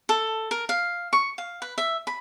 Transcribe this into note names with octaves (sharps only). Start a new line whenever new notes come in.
A4
A#4
F5
C#6
F5
B4
E5
B5